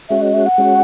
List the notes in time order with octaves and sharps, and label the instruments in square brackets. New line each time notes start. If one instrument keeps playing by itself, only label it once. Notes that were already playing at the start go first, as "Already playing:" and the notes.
[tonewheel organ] G#3 C#4 F#4 [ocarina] E5
[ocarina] D#5
E5
F#5
[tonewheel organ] G#3 C#4 F#4